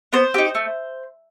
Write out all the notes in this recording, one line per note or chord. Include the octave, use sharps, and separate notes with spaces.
B3 C5
D#4 G4
A3